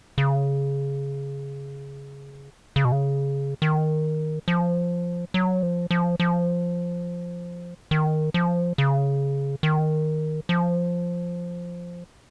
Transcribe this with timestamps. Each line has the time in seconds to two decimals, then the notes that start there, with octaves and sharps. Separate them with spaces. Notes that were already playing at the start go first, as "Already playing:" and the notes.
0.18 C#3
2.76 C#3
2.85 B2
2.92 C#3
3.62 D#3
4.48 F3
5.34 F#3
5.63 F3
5.91 F3
6.20 F3
7.91 D#3
8.34 F3
8.78 C#3
9.63 D#3
10.49 F3